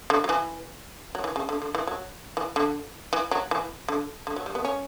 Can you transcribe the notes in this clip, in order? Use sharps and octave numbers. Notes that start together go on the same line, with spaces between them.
D3
F#3
E3
F#3
E3
C#3
D3
D3
E3
F#3
E3
D3
E3
F#3
E3
D3
D3
F#3
G3
B3
C#4